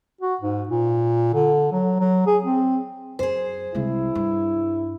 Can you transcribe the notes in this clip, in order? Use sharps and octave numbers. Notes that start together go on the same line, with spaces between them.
F#4
G#2
A#2
D3
F#3
F#3
G#4
C4
F#2 G#4 C5
C2 G#3 E4
G2